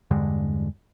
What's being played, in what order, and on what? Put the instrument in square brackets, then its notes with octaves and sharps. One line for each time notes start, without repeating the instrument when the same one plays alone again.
[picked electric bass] E2 G2 D3 G#3